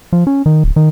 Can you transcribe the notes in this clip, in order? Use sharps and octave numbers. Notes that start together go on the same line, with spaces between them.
F3
C#4
D#3
D1
D#3